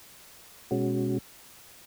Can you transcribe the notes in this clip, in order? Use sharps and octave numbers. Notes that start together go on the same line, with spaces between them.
B2 G#3 C#4 F#4